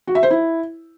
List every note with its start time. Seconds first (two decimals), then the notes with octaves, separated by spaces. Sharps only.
0.07 F#4
0.15 E5
0.23 C5
0.31 E4